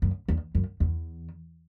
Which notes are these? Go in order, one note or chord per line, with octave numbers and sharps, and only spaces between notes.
F#2
E2
F#2
E2